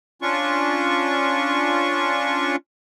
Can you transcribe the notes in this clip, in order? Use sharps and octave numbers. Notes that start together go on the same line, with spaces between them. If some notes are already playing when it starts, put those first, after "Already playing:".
C#4 D4 F4 C#6